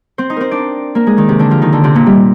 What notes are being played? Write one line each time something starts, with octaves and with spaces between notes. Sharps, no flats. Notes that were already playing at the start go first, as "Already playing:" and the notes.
C4 C5
D#4 D#5
C4 A#4 C5
D4 D5
A#3 A#4
G#3 G#4
D#3 D#4
C3 C4
D3 D4
F3 F4
D#3 D#4
D3 D4
C3 C4
A#2 A#3
G3